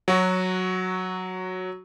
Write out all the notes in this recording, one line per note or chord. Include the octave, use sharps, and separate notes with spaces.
F#3 F#4